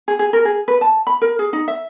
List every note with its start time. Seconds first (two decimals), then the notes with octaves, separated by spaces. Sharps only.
0.08 G#4
0.19 G#4
0.33 A#4
0.45 G#4
0.68 B4
0.81 A5
1.07 B5
1.22 A#4
1.39 G#4
1.53 D#4
1.68 E5